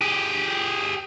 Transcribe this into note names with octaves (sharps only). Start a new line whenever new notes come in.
G4 G#4